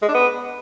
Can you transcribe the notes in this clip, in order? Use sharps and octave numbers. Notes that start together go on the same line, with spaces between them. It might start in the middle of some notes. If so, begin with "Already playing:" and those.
G#3
D4
B3